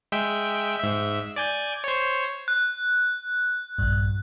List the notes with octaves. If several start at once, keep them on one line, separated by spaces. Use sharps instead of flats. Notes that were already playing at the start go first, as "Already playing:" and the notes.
G#3 E5 G5
G#2 E5
D5 G#5 G6
C5 C#5
F#6
A#1 G2